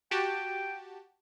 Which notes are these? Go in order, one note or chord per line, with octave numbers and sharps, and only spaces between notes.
F#4 G4 G5 A5